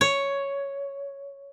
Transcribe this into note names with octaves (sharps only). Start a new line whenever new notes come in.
C#5